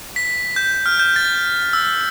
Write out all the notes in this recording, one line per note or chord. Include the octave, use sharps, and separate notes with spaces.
B6
G6
F6
G6
A6
E6